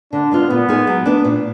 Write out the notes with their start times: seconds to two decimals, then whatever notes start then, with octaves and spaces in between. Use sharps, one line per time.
0.12 D3 D4
0.32 G#3 B3 F4
0.50 A#2 B3
0.69 G#3 D#4 G#4
0.87 F#3
1.06 B3 D4
1.25 A#2